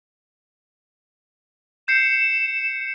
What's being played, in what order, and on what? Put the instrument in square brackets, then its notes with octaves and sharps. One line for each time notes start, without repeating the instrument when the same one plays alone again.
[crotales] G6 C7 C#7 [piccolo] E7